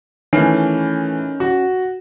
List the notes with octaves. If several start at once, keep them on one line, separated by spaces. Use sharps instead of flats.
D#3 E3 A3 C#4
F#4